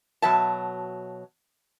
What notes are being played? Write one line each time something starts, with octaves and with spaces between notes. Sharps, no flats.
B2 F#3 E5 A5